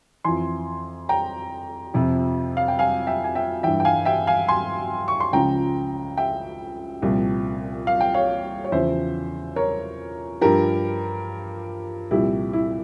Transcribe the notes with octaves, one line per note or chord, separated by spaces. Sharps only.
F2 E3 G#5 C6
G5 A#5
F2 C3 F3
F5
G5
F5 G#5
E5 G5
G#5
E5 G5
G2 E3 E5 G5
G5
F5 G#5
E5 G5
F5 G#5
G#5 C6
C#6
C6
C#2 C#3 F3 G5 A#5
E5 G5
C2 A#2 F3
F5
G5
C#5 F5
C#5
E2 C#3 F3 C5 E5
A#4 C#5
G2 F3 G4 A#4
C2 A#2 F3 E4 G4
E4